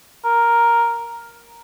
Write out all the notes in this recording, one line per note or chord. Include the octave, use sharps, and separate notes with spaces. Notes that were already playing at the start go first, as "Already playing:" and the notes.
A#4